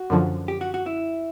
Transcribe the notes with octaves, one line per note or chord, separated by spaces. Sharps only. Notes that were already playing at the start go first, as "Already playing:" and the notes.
Already playing: F#4
F#2 D3 F3
G4
F#4
F#4
E4